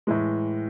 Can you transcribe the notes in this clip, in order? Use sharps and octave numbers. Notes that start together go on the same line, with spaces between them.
A2 E3 G#3